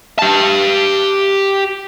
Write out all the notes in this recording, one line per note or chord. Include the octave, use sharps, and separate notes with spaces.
G4 A5